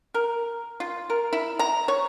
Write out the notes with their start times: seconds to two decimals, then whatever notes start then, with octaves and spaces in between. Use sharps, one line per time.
0.14 A#4
0.80 F4
1.10 A#4
1.33 E4
1.59 A#5
1.88 C#5